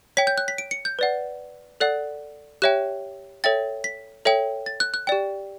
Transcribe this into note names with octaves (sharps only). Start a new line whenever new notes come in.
C#5 G5 B6
G6
F#6
B6
D7
C#7
G6
B4 D5 F#5
A4 D5 F#5 F#6
G4 C#5 E5 G5 F#6
A4 C#5 E5 G5 A6
B6
A4 C#5 E5 G5
A6
F#6
F#6
G4 D5 G5